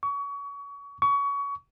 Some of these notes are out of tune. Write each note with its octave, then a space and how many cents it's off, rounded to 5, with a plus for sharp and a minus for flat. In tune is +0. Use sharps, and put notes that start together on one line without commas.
C#6 +30
C#6 +25